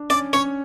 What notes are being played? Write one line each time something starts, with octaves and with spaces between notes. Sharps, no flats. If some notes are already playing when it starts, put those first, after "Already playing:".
Already playing: D4
C#4 D5
C#4 C#5